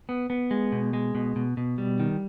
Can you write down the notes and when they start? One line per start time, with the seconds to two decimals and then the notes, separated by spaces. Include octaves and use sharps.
0.09 B3
0.30 B3
0.51 G#3
0.72 B2
0.93 G#3
1.15 B2
1.36 B2
1.57 B2
1.78 G3
2.00 D#3